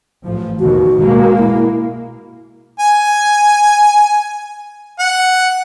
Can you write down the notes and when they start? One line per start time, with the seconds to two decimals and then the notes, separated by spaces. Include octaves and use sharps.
0.24 A1 F3
0.60 D#2 B2 D#3 F#4
0.99 B2 G#3 A#3
1.38 E4
2.80 G#5
4.99 F#5